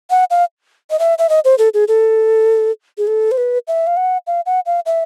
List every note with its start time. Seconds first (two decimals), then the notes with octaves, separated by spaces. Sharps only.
0.10 F#5
0.30 F5
0.90 D#5
0.99 E5
1.18 E5
1.29 D#5
1.45 C5
1.58 A4
1.74 G#4
1.88 A4
2.98 G#4
3.07 A4
3.31 C5
3.38 B4
3.68 E5
3.87 F5
3.97 F#5
4.27 F5
4.46 F#5
4.66 F5
4.86 E5